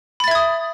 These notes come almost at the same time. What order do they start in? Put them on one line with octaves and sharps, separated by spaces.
B5 A6 E5 G#6 D#6